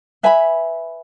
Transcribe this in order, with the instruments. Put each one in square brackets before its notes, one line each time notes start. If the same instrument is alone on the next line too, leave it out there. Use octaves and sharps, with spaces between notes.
[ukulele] B4 E5 G#5 B5